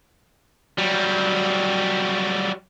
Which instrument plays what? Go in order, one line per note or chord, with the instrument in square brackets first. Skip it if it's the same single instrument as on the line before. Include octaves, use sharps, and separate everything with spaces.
[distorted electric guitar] F#3 G3